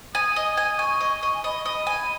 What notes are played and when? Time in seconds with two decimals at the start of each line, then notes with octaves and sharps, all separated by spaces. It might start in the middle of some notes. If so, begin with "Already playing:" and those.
0.14 G#5 D#6
0.36 D#5
0.57 G#5
0.79 G#5 C#6
1.01 D#5
1.23 D#5
1.34 G#5
1.44 D#5 B5
1.65 D#5
1.87 G#5